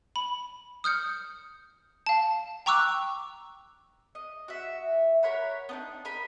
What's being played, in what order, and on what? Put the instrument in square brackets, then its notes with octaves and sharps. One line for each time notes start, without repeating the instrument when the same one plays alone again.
[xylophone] B5
D#6 F6 G6 C#7
F5 A5
G5 A#5 C#6 D6 E6 F#6
[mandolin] D#5
F#4 E5
A#4 C#5 F#5 B5
B3 D4 D#4
A#4 D#5 B5